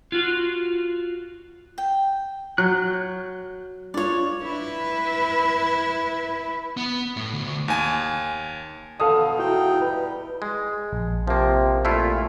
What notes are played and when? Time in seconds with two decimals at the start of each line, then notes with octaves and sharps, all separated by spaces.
0.12 F4 F#4
1.78 G5
2.58 F#3 F#6 G6
3.94 D4 F4 C#5 D5
4.43 E4 B4
6.77 B3
7.17 A2
7.34 D2
7.68 D#2 G#5
9.00 B2 F3 A4 F5 D#6
9.39 E2 D#4 E4 F#4 G5
9.82 G3 B4
10.42 G#3
10.92 A#1
11.27 C3 F3 A#3
11.85 A#2 A3 E4 F4